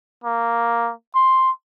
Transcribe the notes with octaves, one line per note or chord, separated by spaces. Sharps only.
A#3
C6